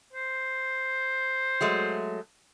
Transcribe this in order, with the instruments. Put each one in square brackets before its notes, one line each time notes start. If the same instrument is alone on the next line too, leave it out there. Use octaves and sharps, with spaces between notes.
[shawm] C5
[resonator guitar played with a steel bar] F#3 G#3 A3